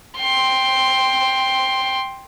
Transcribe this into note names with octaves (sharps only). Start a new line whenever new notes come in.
G5 C6